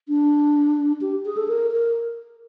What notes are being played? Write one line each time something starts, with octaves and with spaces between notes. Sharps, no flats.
D4
G4
G#4
A4
A#4
A#4